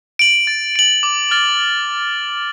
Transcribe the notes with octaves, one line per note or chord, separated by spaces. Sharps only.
D7 F#7
A6
D7 F#7
D6
F6 A6